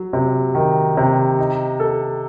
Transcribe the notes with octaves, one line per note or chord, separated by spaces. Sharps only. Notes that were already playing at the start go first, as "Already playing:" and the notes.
Already playing: F#3
C3
D#3
C3
D#4
A4